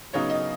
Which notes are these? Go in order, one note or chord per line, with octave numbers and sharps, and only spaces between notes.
C#3 F#3 B3 D#4 C#5
D#5